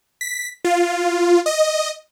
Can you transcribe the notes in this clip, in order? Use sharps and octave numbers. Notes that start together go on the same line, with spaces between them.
B6
F4
D#5